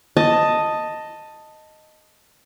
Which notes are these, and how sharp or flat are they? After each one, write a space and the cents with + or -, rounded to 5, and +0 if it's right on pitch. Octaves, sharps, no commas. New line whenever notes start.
D#5 +0 A5 +10